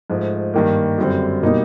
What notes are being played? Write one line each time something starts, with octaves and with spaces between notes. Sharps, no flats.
G#2 F3 A3
G2 D#3 G3 A#3
F#2 D3 G3 C4
B2 G3 A#3 D#4